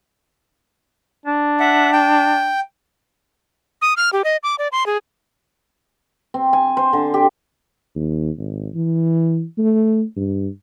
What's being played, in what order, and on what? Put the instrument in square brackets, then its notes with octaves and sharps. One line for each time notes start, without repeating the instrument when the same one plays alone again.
[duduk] D4
[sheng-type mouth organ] E5 F#5
G5
[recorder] D#6
F6
G4
D#5
D6
D5
C6
G#4
[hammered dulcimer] C4
G#5
C5
D3
G4
[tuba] D#2
G#1
E3
A3
G2